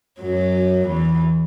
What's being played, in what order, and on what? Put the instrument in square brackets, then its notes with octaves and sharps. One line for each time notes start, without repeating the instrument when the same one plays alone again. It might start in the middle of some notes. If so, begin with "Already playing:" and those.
[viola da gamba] F#2 F#3
E2 E3